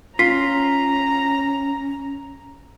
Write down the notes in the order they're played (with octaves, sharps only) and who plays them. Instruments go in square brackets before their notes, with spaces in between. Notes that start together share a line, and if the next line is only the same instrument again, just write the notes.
[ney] C#4 [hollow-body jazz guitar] F4 [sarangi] A#5 [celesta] B6 C7